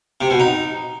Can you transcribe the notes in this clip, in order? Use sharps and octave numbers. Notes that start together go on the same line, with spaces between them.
C3
B2
D#4